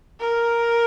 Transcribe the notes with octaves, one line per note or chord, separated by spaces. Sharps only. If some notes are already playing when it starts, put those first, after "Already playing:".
A#4